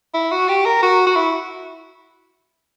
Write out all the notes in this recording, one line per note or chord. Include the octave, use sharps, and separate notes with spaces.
E4
F#4
G4
A#4
F#4
F#4
E4